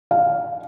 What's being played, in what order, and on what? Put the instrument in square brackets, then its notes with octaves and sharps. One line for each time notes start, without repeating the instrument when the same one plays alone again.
[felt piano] F5